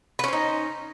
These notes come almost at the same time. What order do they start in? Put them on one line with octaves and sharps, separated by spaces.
B4 C#4 C5 D#4